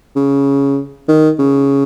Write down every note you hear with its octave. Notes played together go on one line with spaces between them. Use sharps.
C#3
D#3
C#3